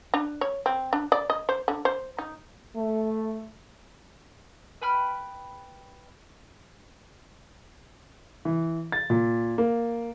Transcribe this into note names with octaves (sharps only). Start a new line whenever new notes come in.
D4
C#5
C4
D4
D5
D#5
C5
D3
C5
D#4
A3
B4 G5 B5 F6
E3
A6
A#2
A#3